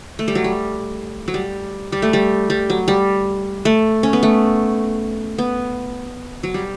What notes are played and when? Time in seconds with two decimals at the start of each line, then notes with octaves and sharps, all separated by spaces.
0.19 A3
0.28 G3
0.35 F#3
0.44 G3
1.28 F#3
1.34 G3
1.92 G3
2.02 A3
2.13 G3
2.50 G3
2.70 F#3
2.88 G3
3.65 A3
4.03 C#4
4.13 B3
4.23 A3
5.38 B3
6.43 F#3
6.54 G3